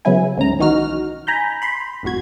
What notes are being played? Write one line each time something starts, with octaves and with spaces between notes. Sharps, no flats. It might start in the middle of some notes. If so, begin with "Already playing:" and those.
C#3 F#3 B3 E4 G#5
D2 G#2 C#3 C#4 A#5
B1 D#3 E3 D#4 F#4 F6
G#5 A#5 B5 G6
B5 C6
G1 F2 A2 F#4 G#6